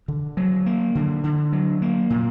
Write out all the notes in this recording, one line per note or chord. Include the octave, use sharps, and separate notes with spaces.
D3
F#3
A#3
D3
D3
F#3
A#3
A#2